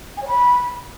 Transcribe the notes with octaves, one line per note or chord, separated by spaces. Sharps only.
G#5
C#5
B5